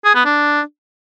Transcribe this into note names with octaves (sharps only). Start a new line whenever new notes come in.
G#4
B3
D4